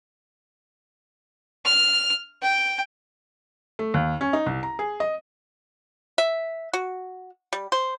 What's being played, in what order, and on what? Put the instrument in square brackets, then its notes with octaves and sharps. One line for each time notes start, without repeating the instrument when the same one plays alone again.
[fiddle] F6
G5
[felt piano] A3
D#2
C#4
D#4
C2
A#5
G#4
D#5
[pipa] E5
F#4
G3
C5